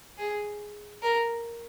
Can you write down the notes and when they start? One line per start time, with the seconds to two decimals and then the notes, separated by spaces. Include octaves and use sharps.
0.18 G#4
1.03 A#4